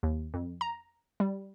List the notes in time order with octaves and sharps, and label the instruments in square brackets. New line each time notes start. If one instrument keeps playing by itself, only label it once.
[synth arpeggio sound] D#2
F2
A#5
G3